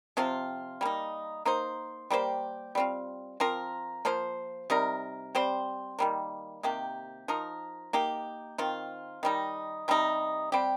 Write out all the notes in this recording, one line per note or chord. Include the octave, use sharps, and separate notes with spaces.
C3 F3 C4 F4
G3 A#3 D#4
A#3 D#4 C5
G3 A#3 G4 C5
G3 C4 F4
F3 C4 F4 A#4
F3 A#3 F4 C5
C3 G3 D#4 A#4
G3 C4 G4 C5
D#3 G3 A#3
C3 D#3 A#3 G4
F3 D#4 A#4
A#3 D#4 G4
D#3 C4 F4
D#3 G3 D#4
C3 G3 D#4 G4
G3 C4 G4